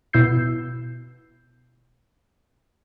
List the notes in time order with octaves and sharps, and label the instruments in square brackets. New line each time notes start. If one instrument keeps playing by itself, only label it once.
[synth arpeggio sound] B2 E4 E6 G6 C7